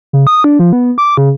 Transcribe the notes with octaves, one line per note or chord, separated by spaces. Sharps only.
C#3
D#6
D4
F3
B3
D6
C#3